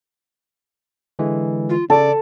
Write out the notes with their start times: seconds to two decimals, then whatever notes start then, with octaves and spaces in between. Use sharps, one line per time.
1.19 D3 E3 G#3
1.70 F4
1.90 C#3 A4 D5